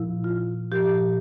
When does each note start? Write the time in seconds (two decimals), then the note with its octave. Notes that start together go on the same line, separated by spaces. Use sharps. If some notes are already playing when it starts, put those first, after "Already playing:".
Already playing: A#2 F3 E4
0.24 F4
0.72 A#2 F3 G4